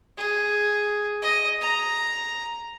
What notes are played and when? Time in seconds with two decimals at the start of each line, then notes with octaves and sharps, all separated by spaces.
0.17 G#4
1.22 D#5
1.61 A#5